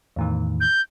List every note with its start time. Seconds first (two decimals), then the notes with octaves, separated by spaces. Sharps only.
0.16 E2 A2 D#3
0.60 G6